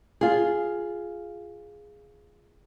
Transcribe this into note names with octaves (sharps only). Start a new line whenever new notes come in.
F4 G#4